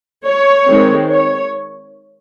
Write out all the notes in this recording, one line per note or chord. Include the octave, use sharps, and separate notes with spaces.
C#5
D#3 G#3 C4
C#5